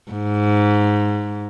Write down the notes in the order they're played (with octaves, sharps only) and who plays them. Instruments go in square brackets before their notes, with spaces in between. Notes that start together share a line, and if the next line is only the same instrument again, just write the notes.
[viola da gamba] G#2